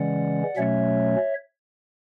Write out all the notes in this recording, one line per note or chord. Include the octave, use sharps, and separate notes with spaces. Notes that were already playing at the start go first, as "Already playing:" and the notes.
Already playing: C#3 E3 G#3 C#4 D5 F#5
B2 F#3 A3 C#4 C#5 E5